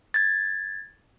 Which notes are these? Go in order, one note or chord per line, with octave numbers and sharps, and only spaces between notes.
G#6 A6